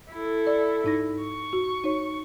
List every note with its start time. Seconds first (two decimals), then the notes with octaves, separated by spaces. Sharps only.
0.12 E4 A4
0.47 D5
0.84 G#2 D#4 A#6
1.23 C#6
1.53 F#4
1.84 D#4 C#5